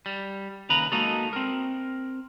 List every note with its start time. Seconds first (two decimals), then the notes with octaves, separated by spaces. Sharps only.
0.06 G3
0.69 D#2 C#3 B4 A#5
0.92 G#3 A#3 B3 D#4 F#4 A4
1.33 C4 A#4